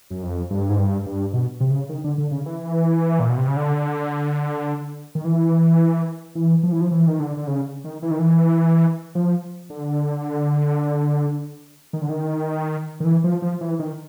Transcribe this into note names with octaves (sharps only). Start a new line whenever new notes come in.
F#2
F2
G2
G#2
G2
G2
B2
C3
C#3
D#3
D3
D3
C#3
E3
A#2
B2
C3
C#3
D3
D#3
E3
E3
F3
E3
F3
E3
D#3
D3
D3
C#3
D#3
E3
D#3
E3
F3
D3
D#3
D3
D#3
D#3
E3
F3
F3
E3
D#3